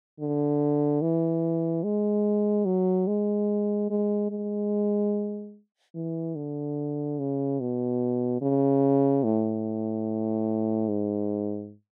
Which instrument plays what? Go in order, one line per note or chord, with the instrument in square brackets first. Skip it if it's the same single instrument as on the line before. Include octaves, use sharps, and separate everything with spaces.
[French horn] D3
E3
G#3
F#3
G#3
G#3
G#3
E3
D3
C#3
B2
C#3
A2
G#2